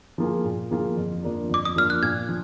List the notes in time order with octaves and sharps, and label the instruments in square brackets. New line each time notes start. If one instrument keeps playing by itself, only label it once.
[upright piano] F3 A#3 F4 G#4
A#2
F3 A#3 F4 G#4
F2
F3 A#3 D4
[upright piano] F2 [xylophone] D6
[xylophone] D#6
[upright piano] F3 A#3 D4 [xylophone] F6
[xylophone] F#6
[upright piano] A#2 [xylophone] G#6
[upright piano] F3